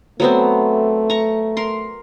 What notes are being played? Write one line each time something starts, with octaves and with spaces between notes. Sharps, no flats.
F#3 A3 B3 C4
A#5 C#6
A#4 C6